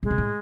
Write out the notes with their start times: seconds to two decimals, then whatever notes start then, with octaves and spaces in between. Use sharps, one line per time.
0.03 A2 G#3
0.10 B2
0.18 A2